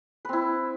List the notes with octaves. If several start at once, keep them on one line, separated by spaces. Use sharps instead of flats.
C4 E4 B4